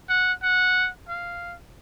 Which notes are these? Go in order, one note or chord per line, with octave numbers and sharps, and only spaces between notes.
F#5
F#5
F5